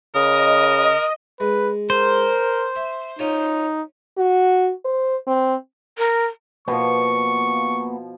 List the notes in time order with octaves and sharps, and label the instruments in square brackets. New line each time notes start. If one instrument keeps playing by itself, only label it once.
[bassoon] C#3 [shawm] A#4 [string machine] D#5 [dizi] D#6
[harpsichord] G#3 [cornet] B4
[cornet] A#4 [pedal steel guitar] C5
[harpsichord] E5
[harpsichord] C#4 F4 C#5 [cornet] D#4
[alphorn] F#4
C5
C4
[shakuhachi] A#4
[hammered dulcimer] B2 F3 [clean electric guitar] A#3 B3 [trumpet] C#6